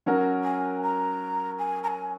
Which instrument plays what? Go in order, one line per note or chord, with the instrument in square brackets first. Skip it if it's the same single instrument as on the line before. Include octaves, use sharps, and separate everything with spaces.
[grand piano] F#3 C#4 F#4 A#4
[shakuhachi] G#5
A#5
G#5
A#5
G#5